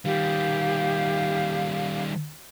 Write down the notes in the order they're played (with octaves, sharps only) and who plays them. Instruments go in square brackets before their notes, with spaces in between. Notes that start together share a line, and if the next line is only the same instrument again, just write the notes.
[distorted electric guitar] D#3 G3 [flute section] G4 F5